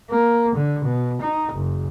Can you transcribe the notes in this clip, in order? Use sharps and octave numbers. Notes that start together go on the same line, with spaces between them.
A#3
D3
B2
D#4
F#1